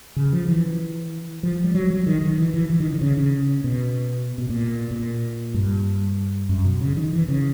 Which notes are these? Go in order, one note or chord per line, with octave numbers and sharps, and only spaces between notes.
C#3
F3
E3
F3
G3
F#3
F#3
D#3
D#3
E3
E3
E3
D#3
D3
C#3
C#3
B2
B2
A#2
A#2
G2
F#2
B2
C#3
D#3
E3
C#3